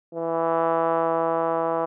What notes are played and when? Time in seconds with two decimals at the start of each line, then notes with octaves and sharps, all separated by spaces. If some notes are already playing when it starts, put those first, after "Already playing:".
0.15 E3